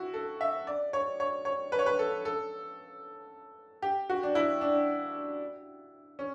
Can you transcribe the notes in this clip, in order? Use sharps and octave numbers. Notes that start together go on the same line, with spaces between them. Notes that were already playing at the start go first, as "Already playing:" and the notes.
Already playing: E4 F#4
A4
E5
D5
C#5
C#5
C#5
B4
C#5
B4
A4
A4
G4
F#4
D4
E4
D4
C#4